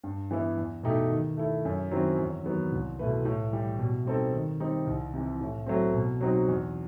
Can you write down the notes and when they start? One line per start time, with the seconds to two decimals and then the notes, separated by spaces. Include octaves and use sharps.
0.04 G2
0.31 E3 B3 E4
0.57 E2
0.83 B2 A3 D#4 G4
1.11 D#3
1.37 A3 E4
1.65 F#2
1.91 D#3 F#3 C4 E4
2.18 E2
2.45 D#3 F#3 B3
2.72 C2
2.99 B2 A3 E4 B4
3.25 A2
3.53 E3 G3
3.79 B2
4.06 G3 C4 D#4 A4
4.33 D#3
4.60 G3 C4 D#4
4.87 C2
5.14 C3 E3
5.40 A2
5.66 F#3 A3 C4
5.94 B2
6.21 F#3 C4 D#4 F#4
6.48 E2